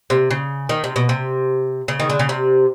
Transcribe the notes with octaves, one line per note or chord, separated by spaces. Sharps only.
C3
C#3
D#3
C3
B2
C3
C#3
D#3
D3
C#3
C3